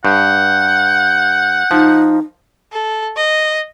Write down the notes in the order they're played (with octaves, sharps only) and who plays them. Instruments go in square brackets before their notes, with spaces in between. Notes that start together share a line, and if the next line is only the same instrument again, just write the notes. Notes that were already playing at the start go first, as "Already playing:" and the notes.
[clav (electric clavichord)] G2 [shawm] F#5 [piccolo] G6
[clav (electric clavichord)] F3 [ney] D#4
[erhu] A4
D#5